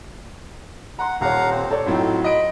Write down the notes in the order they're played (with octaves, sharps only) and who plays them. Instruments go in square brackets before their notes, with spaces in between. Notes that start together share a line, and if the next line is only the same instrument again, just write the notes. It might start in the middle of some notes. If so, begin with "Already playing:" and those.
[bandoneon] F#5 [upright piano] A#5 C6
[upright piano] D#1 C#5 [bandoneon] F5 F#5 A#5
[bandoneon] C4 C5
[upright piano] A4 C#5 D5
[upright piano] A2 F#3 C4 [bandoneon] D#4 F4
[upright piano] D#5 D7 [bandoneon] B5